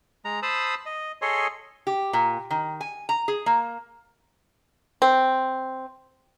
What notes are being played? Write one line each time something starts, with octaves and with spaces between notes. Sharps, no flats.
G#3 A#5
C5 A5 B5 D#6 E6
D#5
G#4 A4 C#5 D#5 C6
G4
A#2
D#3
G#5
A#5
G#4
A#3
C4